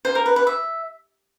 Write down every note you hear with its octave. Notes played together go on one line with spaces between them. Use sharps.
C5
A#4
B4
B4
E5